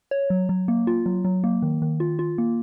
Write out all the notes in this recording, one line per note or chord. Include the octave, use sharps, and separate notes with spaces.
C#5
F#3
F#3
A#3
F4
F#3
F#3
A#3
D#3
D#3
F4
F4
A#3